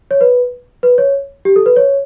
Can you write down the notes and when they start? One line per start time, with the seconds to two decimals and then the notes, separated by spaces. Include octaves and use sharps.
0.11 C#5
0.21 B4
0.83 B4
0.98 C#5
1.45 G4
1.56 A4
1.66 B4
1.76 C#5